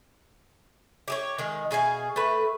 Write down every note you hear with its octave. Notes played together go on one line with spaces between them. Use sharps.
G4 G#4 C#5
D#3 G#3
B2 G#4 F5 G#5
A3 B4